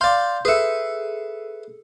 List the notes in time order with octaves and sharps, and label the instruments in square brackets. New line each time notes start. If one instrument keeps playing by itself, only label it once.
[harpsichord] D5 F5 [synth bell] C6 G6
[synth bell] G#4 A4 [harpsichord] B4 E5